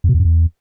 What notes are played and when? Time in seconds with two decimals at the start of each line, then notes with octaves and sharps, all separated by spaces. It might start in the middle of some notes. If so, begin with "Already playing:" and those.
0.04 F2
0.09 B2
0.14 E2
0.20 F#2
0.25 E2